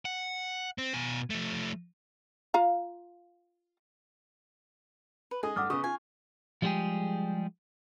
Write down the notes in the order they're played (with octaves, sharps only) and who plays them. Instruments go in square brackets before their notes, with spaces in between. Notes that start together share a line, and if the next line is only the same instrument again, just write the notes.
[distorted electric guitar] F#5
C4
B2 G#5
F3 A3
[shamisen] F4 F5 A#5
[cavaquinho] B4
[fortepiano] G#3 G#4 G#5 [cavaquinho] D#5
[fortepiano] G2 A3 D#6 [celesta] F#5 D6 F6
[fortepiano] C#3 B3 [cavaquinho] D#5 [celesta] C#6
[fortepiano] F4 [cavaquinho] G#5
[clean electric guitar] F3 G3 G#3 B3 G4 G#4